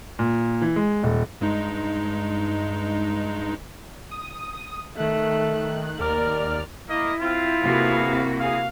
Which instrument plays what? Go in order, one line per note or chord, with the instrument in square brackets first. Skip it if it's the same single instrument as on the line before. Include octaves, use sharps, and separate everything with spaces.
[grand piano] A#2
E3
G#3
D#1
[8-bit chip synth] G2 G#3 D#4
[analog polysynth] D#6
[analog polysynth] D#3 F#6 [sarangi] A3
[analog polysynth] D#2 D5 F6 [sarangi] A#4
[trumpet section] A#3 D#5 [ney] E4
[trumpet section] C4 [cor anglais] F4
[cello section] C3 A#3 F#4 [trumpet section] B3 G#4 F5
[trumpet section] G#4 [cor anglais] F5